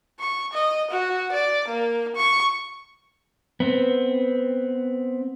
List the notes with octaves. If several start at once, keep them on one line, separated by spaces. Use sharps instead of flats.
C#6
D#5
F#4
D5
A#3
C#6
B3 C4